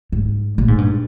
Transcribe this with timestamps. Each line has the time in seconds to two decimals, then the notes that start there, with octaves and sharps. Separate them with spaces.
0.12 G#2
0.58 A#2
0.68 G#2
0.78 G2